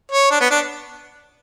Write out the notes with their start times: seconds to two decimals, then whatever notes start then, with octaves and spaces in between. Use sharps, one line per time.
0.11 C#5
0.31 D4
0.40 B3
0.51 D4